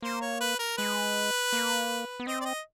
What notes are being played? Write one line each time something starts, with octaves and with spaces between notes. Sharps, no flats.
A#3 C5
C#5
B4
A#4
G#3 B4
A#3
B3
C4 D#5
D5
D#5